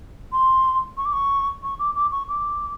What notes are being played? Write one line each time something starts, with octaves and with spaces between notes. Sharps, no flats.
C6
C#6
D6
C#6
C#6
D6
D6
C#6
D6